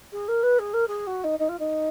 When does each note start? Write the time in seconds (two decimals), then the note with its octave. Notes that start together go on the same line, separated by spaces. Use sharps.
0.12 G#4
0.28 A#4
0.43 B4
0.59 G#4
0.73 A#4
0.88 G#4
1.07 F#4
1.24 D#4
1.39 D#4
1.49 F4
1.59 D#4